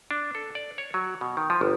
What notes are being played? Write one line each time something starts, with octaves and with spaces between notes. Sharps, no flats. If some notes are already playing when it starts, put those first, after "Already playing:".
D4
A4
D5
C#5
F#3
B2
D#3
F3
G1